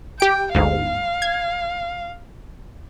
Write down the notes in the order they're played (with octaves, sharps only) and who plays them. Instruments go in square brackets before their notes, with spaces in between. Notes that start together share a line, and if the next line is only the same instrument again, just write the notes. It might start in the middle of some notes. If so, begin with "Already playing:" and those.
[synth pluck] G4 D7 [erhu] G5
[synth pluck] G1 D2 G#2 [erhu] F5
[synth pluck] G#6